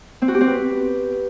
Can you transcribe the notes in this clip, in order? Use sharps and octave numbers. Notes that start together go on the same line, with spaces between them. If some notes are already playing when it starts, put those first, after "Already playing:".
C4
F#4
G4
C4
B4